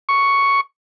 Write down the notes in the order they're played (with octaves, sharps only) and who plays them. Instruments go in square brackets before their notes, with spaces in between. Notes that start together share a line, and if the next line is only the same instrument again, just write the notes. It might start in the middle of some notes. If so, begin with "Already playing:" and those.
[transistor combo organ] C#6